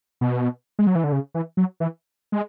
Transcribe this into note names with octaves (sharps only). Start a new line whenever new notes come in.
B2
G#3
F#3
E3
D3
C#3
E3
F#3
E3
G#3